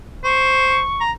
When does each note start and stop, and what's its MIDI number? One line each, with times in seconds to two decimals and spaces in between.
0.24 0.81 72
0.24 1.03 85
1.01 1.11 82